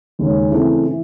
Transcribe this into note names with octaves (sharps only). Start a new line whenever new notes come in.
D#2 C#3 G#3 C#4
C#3 E3 A3 C4
E3